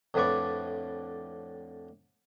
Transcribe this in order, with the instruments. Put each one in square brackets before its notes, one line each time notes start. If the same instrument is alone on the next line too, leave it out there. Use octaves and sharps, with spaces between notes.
[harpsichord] F2 A2 D3 B4 D5 C#6